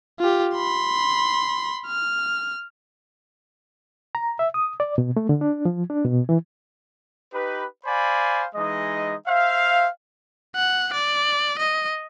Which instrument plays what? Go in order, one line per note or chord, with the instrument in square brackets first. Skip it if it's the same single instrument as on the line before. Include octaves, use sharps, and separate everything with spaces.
[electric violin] F4 G4
B5 C6
F6
[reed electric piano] A#5
E5
D#6
D5
B2
A3
D3
D4
F3
D4
B2
E3
[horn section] D#4 G4 B4
C5 D5 F5 G#5 B5
E3 G#3 D#4 D#5
C5 E5 F5
[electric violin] F#5
D5
D#5